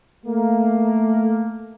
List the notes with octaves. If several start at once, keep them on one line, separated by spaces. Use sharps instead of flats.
A3 A#3